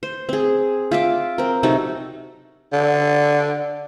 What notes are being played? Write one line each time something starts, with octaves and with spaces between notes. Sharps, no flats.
C5
C4 G#4
F4 E5 D6
C4 A#4
C3 F#3 D#4 A4
D3